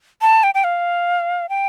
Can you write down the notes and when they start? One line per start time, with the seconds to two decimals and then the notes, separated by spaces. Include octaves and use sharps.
0.22 A5
0.43 G5
0.55 G5
0.64 F5
1.49 G5